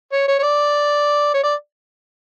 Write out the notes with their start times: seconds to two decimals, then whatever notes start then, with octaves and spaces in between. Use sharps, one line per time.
0.13 C#5
0.28 C#5
0.39 C#5
0.43 D5
1.34 C#5
1.43 D5